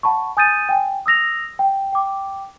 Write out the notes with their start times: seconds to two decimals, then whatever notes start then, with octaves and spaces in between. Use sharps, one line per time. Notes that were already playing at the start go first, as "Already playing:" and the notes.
0.03 F#5 A5 B5 C#6
0.37 G#5 D#6 G6 A6 D#7
0.69 G5 G#5
1.06 D#6 E6 A#6 F7
1.59 G5
1.93 G5 D6